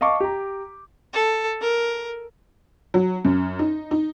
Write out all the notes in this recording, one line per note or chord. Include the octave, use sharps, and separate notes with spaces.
D#5 F5 A5 C#6 D6
G4 A#5
A4
A#4
F#3
F#2
D#4
D#4